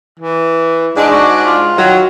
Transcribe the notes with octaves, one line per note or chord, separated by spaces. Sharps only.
E3
G#2 G#3 D4
F#4
F4
D#3 F#3